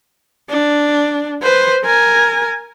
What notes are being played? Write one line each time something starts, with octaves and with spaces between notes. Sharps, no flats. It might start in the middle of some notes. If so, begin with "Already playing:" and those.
D4
B4 C5
A#4 G#5